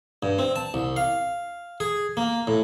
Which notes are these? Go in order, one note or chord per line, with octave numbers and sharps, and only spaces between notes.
G2
C4
A5
C2
F5
G#4
A#3
A2